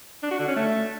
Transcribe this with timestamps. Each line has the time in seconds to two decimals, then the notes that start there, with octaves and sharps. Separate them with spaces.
0.23 D4
0.31 F#4
0.39 D3
0.48 C#4
0.56 A3